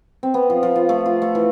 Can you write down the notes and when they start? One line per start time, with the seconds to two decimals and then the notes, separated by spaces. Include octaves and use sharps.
0.23 C4
0.34 B3
0.50 F3
0.63 F3
0.75 F4
0.89 A3
1.06 F4
1.22 A3
1.35 E3